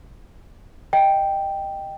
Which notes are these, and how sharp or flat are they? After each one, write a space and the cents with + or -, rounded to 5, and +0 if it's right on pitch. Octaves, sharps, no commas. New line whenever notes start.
D#5 +0 G5 +0